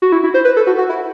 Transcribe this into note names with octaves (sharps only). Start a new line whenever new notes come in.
F#4
E4
E4
C5
B4
A4
F#4
F#4
E4